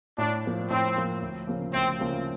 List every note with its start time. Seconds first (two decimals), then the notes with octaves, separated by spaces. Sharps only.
0.18 A2 D4
0.45 F3 A#3
0.70 A2 C4
0.96 F3 A#3
1.22 D2
1.47 C#3 F3 A#3
1.73 D2 C4
2.00 C#3 F3 A#3